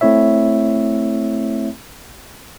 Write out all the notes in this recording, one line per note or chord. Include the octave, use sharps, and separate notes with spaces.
A3 C4 E4 C#5 E5